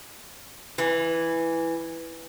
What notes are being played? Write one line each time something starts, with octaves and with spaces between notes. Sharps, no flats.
E3